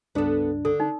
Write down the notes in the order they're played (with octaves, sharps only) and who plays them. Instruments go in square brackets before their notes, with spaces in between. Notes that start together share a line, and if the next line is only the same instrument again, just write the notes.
[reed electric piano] C#2 G2 D4 [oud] B3 A4
[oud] D3 [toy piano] A4
[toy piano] D#4